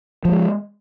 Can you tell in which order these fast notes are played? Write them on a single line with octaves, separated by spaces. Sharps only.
F3 A3 G#3